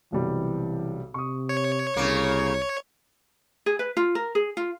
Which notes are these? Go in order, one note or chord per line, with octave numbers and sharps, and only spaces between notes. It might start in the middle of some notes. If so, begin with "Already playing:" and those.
B1 C3 E3 G3
C3 C#6 D#6
C#5
C2 C#3 A#3
G#4
B4
F4
A#4
G#4
F4